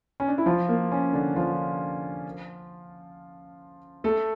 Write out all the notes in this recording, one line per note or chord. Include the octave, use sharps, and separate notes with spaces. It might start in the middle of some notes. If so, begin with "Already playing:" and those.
C#4
D4
E4
F3 F4
A#3
C#4
D3 D4
F3 F4
A3 A4